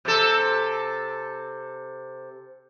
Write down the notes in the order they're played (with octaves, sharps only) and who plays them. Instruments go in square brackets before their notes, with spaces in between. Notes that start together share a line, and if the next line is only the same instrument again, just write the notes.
[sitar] C3 A4